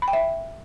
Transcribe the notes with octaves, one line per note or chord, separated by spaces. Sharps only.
B5
G5
E5